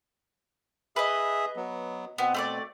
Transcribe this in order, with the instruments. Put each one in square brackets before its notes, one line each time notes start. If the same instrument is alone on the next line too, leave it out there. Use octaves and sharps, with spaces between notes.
[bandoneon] G#4 E5 [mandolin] B4 D#5
[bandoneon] F#3 B3
[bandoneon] B2 C4 [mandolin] B3
[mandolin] A3 B4 D5